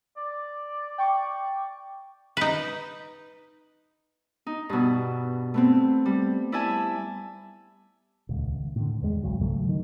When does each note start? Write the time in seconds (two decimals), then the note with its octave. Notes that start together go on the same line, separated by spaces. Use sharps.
0.17 D5
0.98 G5 C#6 D6
2.37 D#4 B4
4.46 D#4
4.69 G2 B2
5.54 A3 B3 C4
6.06 G3
6.52 E4 D5 E5 G#5 A5
8.29 D#1 C#2
8.76 A2 D3
9.02 E2 G#3
9.23 G1 C2 G2 F#3
9.41 G#1 C#3 F#3 A3
9.69 D#3